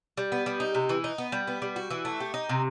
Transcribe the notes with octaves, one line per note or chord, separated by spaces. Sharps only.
G3
B3
G3
D#4
C3
E3
D#4
B3
G3
B3
G3
F#4
E3
A3
G4
D#4
C3